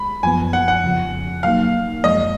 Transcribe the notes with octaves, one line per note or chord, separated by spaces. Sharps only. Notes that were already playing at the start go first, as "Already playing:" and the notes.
Already playing: G#3 B5
F#2 F3 B3 G#5
F#5
F#5
F2 C#3 F3
B2 F#3 A#3 D#4 F5
F#2 F3 G#3 D#5